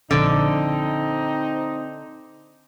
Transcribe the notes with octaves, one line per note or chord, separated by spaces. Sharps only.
A#1 D3 C4 D#4